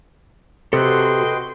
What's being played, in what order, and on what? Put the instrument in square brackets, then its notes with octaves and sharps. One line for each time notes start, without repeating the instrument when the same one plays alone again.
[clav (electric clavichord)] C3 [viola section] F#4 C6 [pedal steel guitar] A4 F#6 [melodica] B4 D#5 G5